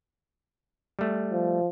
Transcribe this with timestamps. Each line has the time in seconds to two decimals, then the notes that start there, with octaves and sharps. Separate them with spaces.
0.99 G3 A3
1.32 F3